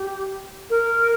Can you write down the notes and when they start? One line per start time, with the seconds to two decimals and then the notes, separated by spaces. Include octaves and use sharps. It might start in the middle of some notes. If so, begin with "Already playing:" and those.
Already playing: G4
0.70 A#4